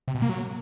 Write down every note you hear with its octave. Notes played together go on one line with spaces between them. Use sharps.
C3
B2
A#3
F#3